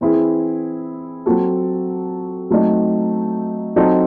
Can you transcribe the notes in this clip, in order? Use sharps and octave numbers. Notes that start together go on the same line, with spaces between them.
E3 C4 E4 G#4
F#3 C4 F#4 A4
F#3 A3 C4 D#4
F#3 C4 D#4 A4